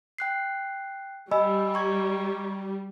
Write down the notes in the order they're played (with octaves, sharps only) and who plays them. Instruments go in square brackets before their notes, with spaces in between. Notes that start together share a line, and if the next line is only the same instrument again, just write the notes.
[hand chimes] G5 F#6 C7
[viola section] G3 [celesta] D#5 [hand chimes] G#5 B5 E6
[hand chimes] A#5 C#6 G#6